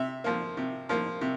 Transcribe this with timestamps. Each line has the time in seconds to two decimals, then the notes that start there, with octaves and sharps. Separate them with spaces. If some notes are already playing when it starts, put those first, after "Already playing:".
Already playing: C3 E5
0.24 F3 A#3
0.57 C3
0.89 F3 A#3
1.21 C3